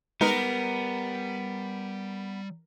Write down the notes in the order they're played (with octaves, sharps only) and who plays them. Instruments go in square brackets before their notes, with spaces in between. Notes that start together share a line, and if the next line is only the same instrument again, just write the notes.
[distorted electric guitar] G3 [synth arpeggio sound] G#3 D#4 B4 [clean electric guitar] B3 [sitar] A#4